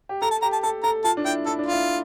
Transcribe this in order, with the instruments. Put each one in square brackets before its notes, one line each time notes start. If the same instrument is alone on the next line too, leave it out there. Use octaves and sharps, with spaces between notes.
[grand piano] G4
[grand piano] A4 [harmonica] A#5
[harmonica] A5
[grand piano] G4 [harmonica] A#5
[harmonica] A5
[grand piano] A4 [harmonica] A5
[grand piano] A4 [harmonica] A#5
[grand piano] F4 [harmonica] A5
[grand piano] D4
[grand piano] E4 [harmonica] G5
[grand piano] E4 [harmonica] A4
[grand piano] D4
[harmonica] F4
[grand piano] E4